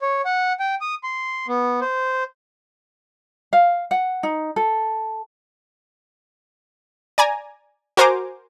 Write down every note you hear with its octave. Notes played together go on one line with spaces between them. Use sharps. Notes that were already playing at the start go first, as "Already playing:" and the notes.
C#5
F#5
G5
D#6
C6
B3
C5
F5
F#5
D#4
A4
D5 G#5 A#5
F#4 A#4 C5 G#5 A#5 D6